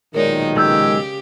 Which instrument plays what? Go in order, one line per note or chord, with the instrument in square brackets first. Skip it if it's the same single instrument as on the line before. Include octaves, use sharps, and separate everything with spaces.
[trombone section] B1 A#2 D#3 [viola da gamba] G#3 D#4 [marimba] A#4 C#5 D5
[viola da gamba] C#3 G4 [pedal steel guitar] G#3 E6 G6